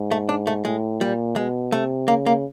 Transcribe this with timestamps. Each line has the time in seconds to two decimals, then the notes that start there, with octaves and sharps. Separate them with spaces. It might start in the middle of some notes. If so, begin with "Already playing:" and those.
Already playing: G#2
0.11 A3
0.29 D4
0.47 A3
0.65 A2 G#3
1.01 A#2 G3
1.36 B2 G#3
1.72 C3 A3
2.08 C#3 A#3
2.26 A#3